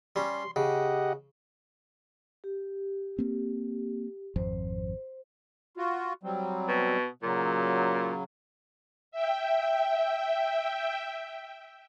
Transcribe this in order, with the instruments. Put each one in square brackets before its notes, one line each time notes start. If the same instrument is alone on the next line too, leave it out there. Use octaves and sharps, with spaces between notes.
[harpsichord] G3 C#4 [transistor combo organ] C6
[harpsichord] C#3 [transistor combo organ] G4 D#5 F#5
[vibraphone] G4
[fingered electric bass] A#3 C4
[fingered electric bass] G#1 F2 [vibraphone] C5
[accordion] F4 F#4
F#3 G3 C4
[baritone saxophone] B2
[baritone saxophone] A#2 [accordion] C#3 F#3
[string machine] E5 G5